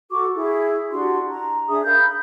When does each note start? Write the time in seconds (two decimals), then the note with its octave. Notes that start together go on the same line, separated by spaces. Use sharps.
0.10 F#4 A4 C#6 D6
0.35 E4 G#4
0.91 D4 F#4 G4 C6
1.27 A#5
1.69 D4 G#4 E5 D#6
1.85 A#4 F5 B5 G6